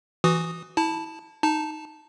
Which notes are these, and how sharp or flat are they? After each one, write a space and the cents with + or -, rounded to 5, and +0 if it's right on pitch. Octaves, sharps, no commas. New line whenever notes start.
E3 +15 F#4 +0 D#6 +0
E4 -25 A5 +0
D#4 +0 A5 +0